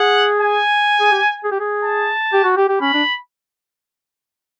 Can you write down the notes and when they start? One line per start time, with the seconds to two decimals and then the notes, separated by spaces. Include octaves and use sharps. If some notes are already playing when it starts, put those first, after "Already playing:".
Already playing: G#4 F#5
0.40 G#5
1.00 G#4
1.12 G4
1.44 G#4
1.52 G4
1.60 G#4
1.84 A5
2.33 G4
2.45 F#4
2.57 G4
2.69 G4
2.81 C#4 B5
2.94 D4